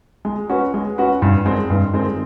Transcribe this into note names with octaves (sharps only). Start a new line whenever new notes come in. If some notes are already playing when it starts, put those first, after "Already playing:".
G#3
C#4 F#4 B4
G#3
C#4 F#4 B4
G2
D#3 G#3 C4
G2
D#3 G#3 C4